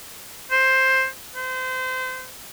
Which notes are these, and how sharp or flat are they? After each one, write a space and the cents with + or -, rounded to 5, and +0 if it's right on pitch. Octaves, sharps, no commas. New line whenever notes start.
C5 +10
C5 -30